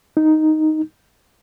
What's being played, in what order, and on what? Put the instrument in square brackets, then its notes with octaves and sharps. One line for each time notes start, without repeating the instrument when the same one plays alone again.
[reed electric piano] D#4